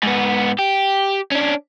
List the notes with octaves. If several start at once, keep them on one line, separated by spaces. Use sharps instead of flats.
G#2 B3
G4
C#4 D4